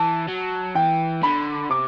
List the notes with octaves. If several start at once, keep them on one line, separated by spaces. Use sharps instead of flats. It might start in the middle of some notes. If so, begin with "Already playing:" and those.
Already playing: E3 A5
F#3
E3 G5
D3 B5
C3 D6